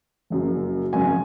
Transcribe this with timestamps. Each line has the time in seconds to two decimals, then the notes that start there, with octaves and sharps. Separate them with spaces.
0.30 F#1 F#2 C#3 F#3
0.93 G#1 F#2 C#3 G#5